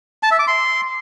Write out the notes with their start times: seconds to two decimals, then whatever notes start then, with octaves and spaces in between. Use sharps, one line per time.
0.23 A5
0.31 E5
0.39 D6
0.47 C6